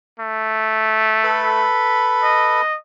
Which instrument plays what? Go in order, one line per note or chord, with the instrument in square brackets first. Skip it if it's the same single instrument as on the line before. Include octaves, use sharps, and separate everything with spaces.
[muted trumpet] A3
[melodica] A4 B4 B5
[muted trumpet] D#5